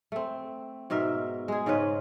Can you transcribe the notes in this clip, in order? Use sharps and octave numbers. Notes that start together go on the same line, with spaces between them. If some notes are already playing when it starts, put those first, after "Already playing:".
A3 C4
G#2 B2 A#4 E5
G#3 G#4
G#2 C#3 C#4 B4